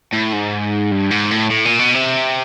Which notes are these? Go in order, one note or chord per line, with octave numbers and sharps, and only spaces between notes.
A2
G#2
G2
G#2
A2
A2
A#2
B2
C3